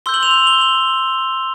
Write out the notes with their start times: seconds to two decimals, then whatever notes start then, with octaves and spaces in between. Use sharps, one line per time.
0.06 C6 E6 G6 G7
0.14 F#7
0.23 F7
0.31 F#7
0.47 G7
0.61 F#7